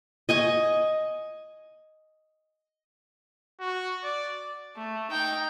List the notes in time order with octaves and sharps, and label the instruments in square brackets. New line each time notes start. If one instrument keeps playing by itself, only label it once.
[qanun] D#5 G#5 C#6
[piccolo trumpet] F#4
D5
[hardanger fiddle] A3
D#4 G5